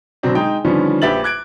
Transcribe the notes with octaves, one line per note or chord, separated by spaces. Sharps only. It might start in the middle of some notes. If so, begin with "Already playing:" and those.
B2 D3 F#3 C4 D4
G#3 D#4 G#4 G5
D3 D#3 F3 G3 B3 C#4
A#1 G4 B4 E5 A6 F#7
D6 F#6 G#6 D7